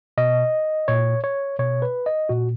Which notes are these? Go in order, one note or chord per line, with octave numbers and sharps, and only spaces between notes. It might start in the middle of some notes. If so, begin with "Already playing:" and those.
B2 D#5
A#2 C#5
C#5
B2 C#5
B4
D#5
A#2 F#4